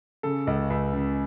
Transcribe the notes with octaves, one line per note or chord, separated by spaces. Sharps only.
C#3 A4
C#2
C#2
C#3